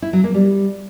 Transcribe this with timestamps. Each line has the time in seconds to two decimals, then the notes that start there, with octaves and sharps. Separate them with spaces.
0.02 E4
0.13 F#3
0.24 A#3
0.34 G3